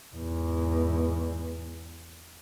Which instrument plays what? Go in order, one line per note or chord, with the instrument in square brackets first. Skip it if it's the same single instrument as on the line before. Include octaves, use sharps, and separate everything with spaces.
[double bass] E2 G#2